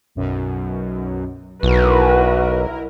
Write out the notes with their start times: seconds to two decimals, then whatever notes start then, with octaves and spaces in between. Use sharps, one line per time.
0.15 B1 F#2 B2
1.63 B1 E4 F#4 A#4 B4